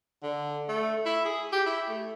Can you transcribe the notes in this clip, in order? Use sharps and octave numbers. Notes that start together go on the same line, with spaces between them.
D3
A3
E4
G#4
G4
E4
A3